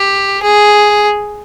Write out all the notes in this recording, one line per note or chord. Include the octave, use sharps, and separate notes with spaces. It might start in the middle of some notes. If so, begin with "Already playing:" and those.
Already playing: G4
G#4